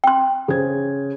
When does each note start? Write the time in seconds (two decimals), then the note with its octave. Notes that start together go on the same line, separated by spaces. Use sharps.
0.04 G5 C6
0.48 C#3 C5 G#6